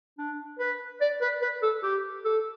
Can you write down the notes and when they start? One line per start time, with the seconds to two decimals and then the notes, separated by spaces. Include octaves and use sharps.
0.18 D4
0.59 B4
1.01 D5
1.22 B4
1.42 B4
1.63 A4
1.83 G4
2.25 A4